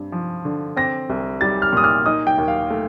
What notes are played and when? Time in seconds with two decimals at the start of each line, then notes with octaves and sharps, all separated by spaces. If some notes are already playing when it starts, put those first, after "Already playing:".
Already playing: G2 C4
0.12 F3
0.45 D3
0.76 C4 A#6
1.10 C2
1.41 G3 A6
1.62 F6
1.73 A#2 D#6
1.84 F6
2.06 D#4 D#6
2.27 G5
2.38 D#2
2.48 F5
2.70 A3